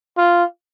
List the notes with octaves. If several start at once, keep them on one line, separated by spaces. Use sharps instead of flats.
F4